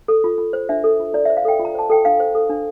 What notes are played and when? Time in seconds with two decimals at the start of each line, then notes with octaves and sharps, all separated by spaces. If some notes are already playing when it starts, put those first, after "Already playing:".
0.08 A4
0.24 F4
0.38 F4
0.53 C5
0.69 D4 E5
0.84 A4
1.00 F4
1.14 E4 D5
1.26 C5 E5
1.37 F5
1.45 A4 G5
1.59 F4
1.65 A#5
1.74 C5 A5
1.90 A4 G5
2.05 D4 F5
2.20 C5
2.35 A4
2.50 D4